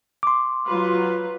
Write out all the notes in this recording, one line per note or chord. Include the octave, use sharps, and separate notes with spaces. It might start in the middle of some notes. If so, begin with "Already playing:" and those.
C6 D6
F#3 F4 B4